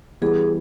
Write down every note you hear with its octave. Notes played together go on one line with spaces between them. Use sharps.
E3 G3 B3 E4 G#4